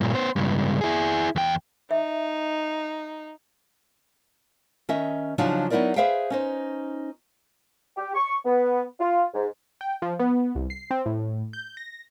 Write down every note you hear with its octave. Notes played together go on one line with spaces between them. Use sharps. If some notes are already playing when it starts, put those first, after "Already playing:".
G2 A#2
B3 C5
C#2 G2
E4 G#4
E2 G5
D#4 E5
D#3 C#4 D#5 E5
C#3 F3 F#3 D4 D#4
F#3 B3 D#4 E4 A#4 D5
G#4 B4 C5 E5 F5 G5
C#4 D#4 C5
G4
C#6
B3
F4
G#2
G5
F3
B3
C2
C7
C4
A2
G6
A#6